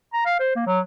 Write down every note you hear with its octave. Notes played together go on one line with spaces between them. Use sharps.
A#5
F5
C5
A#3
F#3